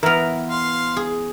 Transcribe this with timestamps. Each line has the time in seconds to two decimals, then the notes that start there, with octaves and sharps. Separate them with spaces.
0.03 E3 B3 A#4
0.49 F5 C6
0.97 G#4